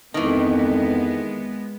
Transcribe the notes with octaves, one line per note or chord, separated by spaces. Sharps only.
F2 D#3 E3 G#3 B3